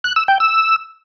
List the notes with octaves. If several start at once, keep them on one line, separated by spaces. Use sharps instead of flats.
F#6
E6
G5
E6